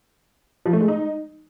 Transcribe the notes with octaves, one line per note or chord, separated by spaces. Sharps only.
F3
A3
G#3
D#4